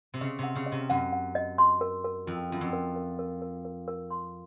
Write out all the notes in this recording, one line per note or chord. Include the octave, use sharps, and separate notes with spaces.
C3
C#3 D#5
C3 F#5
C#3
D#5
C3
F#2 F#5
F#5
D#5
C6
A#4
A#4
F2 F4
F#2 F4
F2
A#4
A#4
A#4
A#4
A#4
A#4
C6